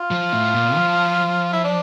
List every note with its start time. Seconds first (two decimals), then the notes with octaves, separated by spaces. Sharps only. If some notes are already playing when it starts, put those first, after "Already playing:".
Already playing: F4
0.11 F3
0.33 A2
0.54 A#2
0.76 F3
1.53 E4
1.64 D4